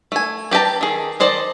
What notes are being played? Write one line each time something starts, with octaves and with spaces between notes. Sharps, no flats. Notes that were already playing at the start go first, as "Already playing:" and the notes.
A3 G#5
B3 G4 B4 A5 A#5
D#3 G#4
D#3 C5 D5 D#5 A5